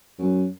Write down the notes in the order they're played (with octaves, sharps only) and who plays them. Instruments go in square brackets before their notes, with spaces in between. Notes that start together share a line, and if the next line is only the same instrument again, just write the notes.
[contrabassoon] F#2